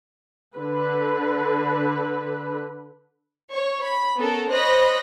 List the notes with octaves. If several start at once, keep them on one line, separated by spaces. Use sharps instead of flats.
D3 B4
C#5 C#6
B5
B3 C#4 A4 A#4
C5 C#5 D#5 B5 F#6 A#6